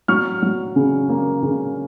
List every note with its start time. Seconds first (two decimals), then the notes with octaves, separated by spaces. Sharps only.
0.08 F#3 C#6 F6
0.42 F#3
0.76 C#3
1.09 A#3
1.43 C#3